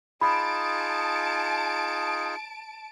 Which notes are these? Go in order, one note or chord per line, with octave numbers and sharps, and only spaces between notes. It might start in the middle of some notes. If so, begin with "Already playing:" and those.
D#4 F4 G#4 A5 B5 D7